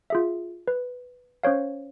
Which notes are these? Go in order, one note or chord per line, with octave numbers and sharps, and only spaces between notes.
F4 G#4 E5
B4
C#4 C5 C#5 F5